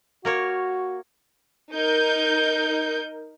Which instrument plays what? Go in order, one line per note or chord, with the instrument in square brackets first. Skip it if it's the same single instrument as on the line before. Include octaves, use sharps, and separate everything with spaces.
[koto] A#3 A#4 C#5 [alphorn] F#4
[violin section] D#4 A#4 G6